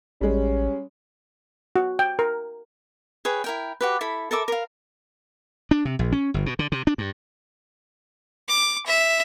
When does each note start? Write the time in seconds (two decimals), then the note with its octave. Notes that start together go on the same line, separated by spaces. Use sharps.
0.21 A1 G3 G#3 C#4
1.76 F#4
1.99 G5
2.19 A#4
3.25 G#4 B4 C#5 G5
3.44 E4 A#4 G5
3.81 F#4 G4 B4
4.01 E4 A4 B5
4.31 A4 A#4 E5 D6
4.48 A#4 F5
5.71 D4
5.85 C3
5.99 A#1
6.12 C#4
6.34 G1
6.46 B2
6.59 D3
6.72 C3
6.87 D4
6.98 G2
8.48 D6
8.86 E5